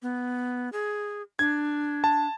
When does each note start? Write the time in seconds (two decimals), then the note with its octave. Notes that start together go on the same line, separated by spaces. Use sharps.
0.02 B3
0.72 G#4
1.39 D4 G#6
2.04 A5